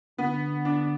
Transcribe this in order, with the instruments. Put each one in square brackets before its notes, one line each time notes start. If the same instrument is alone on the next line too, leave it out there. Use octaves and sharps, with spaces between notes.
[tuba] D3 [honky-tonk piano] B3
[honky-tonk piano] D4